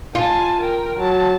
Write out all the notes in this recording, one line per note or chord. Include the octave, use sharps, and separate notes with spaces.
F4 G#5 A5
A#4 G5
F#3 A5